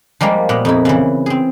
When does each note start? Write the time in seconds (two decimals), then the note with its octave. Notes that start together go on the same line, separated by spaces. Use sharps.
0.21 F3 G3 G#3 A#3
0.49 A#2 B3
0.65 F2 D#4 E4
0.85 C#3 E3
1.26 C4 G#4